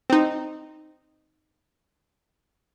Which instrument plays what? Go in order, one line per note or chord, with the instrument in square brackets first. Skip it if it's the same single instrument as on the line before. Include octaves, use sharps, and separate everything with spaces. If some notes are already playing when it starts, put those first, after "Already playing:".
[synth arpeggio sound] C4 D#4